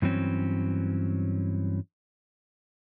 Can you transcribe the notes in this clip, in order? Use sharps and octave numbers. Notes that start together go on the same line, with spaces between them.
G2 E3 F#3 C4 C#4